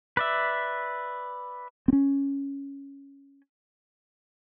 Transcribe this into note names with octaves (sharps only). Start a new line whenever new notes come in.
B4 D5 E5
C4 C#4